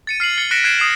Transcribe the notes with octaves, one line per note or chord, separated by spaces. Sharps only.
A6 C#7 D#7
F6 C7 D#7 F#7
A6 C#7 G7
F#6 A#6 B6 C#7 D7 E7
F#6 G#6 C7 D7 E7
D#6 C7 E7